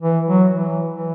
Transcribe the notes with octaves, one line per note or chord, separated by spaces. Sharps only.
E3
F#3
E3
E3